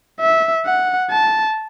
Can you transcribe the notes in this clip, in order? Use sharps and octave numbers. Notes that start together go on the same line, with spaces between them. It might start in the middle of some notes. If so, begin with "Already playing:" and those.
E5
F#5
A5